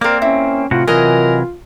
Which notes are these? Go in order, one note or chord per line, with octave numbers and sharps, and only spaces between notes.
A#3 C4 A#4 D5
C#4 E4
A2 C3 F4 F#4
C3 E3 F#3 F4 A#4 D#5 G#5